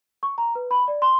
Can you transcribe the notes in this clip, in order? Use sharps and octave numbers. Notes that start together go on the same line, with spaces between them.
C#6
A#5
B4
B5
D5
C6